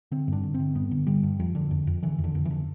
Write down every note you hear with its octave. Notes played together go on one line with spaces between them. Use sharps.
D3 C4
G2 D4
D3
C4
D3
G2 B3
D3
D3 G3
G2
F2 F3
D3
F2
F2
D3 E3
F2
D3
F2
E3
D3